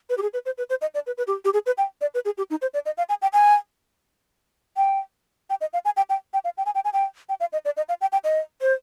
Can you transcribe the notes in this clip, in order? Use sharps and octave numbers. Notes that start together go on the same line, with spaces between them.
B4
G4
G#4
B4
C5
B4
C5
D#5
D5
B4
B4
G4
G4
G#4
B4
G5
D5
B4
G#4
G4
D#4
C5
D5
D#5
F5
G#5
G5
G#5
G5
G5
D#5
F5
G#5
G5
G5
G5
F5
G5
G#5
G5
G#5
G5
G5
F5
D#5
D5
D#5
F5
G5
G5
D#5
C5